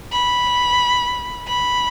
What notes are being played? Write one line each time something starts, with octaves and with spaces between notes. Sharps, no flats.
B5
B5